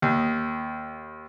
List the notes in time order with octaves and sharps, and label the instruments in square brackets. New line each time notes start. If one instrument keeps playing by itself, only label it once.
[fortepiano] D#2